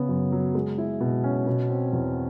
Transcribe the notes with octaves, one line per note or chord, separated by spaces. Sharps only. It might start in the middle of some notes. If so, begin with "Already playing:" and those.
Already playing: C#3 B3
F#2
F#3
G#3
E4
B2
C#4
B2
C4
E2